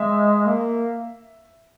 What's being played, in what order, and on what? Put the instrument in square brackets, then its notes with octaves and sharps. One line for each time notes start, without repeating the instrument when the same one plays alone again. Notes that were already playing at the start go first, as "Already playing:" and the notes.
Already playing: [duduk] G#3 [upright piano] E5
[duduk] A#3